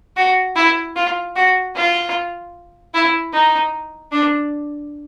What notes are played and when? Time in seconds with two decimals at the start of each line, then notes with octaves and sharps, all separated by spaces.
0.17 F#4
0.56 E4
0.96 F4
1.36 F#4
1.75 F4
2.94 E4
3.33 D#4
4.12 D4